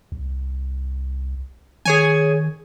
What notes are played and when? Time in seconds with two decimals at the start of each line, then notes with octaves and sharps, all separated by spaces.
0.12 C2
1.85 D#3 G#4 C#5 G#5